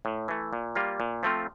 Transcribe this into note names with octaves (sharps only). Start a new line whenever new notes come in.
A2
E3 A3
A#2
G3 A#3 F4
A#2
F3 A3 C4 F4